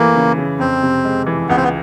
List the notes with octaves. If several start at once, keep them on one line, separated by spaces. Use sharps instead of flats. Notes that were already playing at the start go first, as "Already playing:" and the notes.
Already playing: E3 A3 A#3
C#3
C#3
F2 C4
C3
G#3
E3
C#2 B3
C4
B3